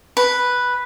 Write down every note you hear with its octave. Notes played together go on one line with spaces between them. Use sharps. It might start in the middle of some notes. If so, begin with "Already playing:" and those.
B4